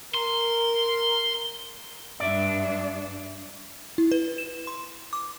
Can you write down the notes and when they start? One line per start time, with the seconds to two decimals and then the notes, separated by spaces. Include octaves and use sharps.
0.14 A#4 C6
2.20 G2 D4 D5 E5
3.98 E4
4.12 B4
4.38 E7
4.67 C6
5.13 D6